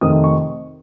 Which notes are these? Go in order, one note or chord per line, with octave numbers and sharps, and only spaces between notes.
F2 C3 D#3 A3 C4 D#6
C#6